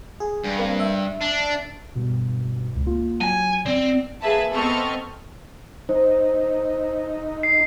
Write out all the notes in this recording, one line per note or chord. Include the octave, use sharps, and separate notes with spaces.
G#4
G2
A#3 C4
E5
D4
G2 B2
C#2
A#3 F4
F#3 G#5
C4 D5
A#3 G#4 B4 E5 A5
B3 C4 A4 D#5 C#6 F6
D#4 C5
C7